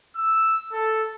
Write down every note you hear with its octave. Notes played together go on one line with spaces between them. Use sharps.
E6
A4